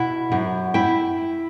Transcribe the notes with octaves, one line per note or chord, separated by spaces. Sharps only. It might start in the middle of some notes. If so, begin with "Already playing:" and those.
Already playing: B2 E4 F#5
F#2
E4 G5